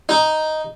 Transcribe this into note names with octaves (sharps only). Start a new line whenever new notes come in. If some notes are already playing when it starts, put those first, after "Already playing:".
D#4